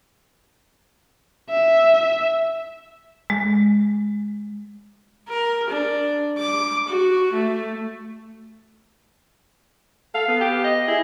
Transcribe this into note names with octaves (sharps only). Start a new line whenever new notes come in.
E5
G#3
A#4
D4
D6
F#4
A3
A4 F5
B3
G4
D#5
E4 G#4